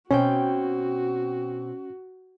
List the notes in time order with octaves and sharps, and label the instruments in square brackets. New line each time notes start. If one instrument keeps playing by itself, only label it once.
[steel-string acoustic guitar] B2 C4 G5 [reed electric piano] C#4 [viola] F#4